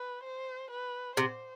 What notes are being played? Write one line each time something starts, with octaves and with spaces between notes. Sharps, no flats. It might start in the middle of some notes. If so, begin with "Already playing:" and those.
Already playing: B4
C5
B4
C3 C5